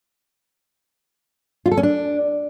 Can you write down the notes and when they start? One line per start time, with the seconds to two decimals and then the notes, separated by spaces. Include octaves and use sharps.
1.66 F4
1.71 A4
1.77 C#4
1.83 D4